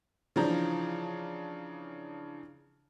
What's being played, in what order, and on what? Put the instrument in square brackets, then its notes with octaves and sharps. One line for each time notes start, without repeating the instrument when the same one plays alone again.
[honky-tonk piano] C#3 E3 F3 D4 A#5 G6